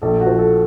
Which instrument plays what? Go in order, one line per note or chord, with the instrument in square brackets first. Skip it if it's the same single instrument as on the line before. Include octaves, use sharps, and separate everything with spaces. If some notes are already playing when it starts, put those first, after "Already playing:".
[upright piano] A#1 A4
F#4
F3
A4